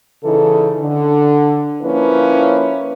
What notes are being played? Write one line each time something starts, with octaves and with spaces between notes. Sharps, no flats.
C#3 E3 D#4 A4
D3
F3 A#3 C#4 E4 B4